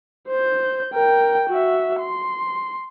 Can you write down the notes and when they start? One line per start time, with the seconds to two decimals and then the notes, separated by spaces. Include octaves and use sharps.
0.28 C5 G6
0.93 A#4 G5
1.49 F#4 E5
2.00 C6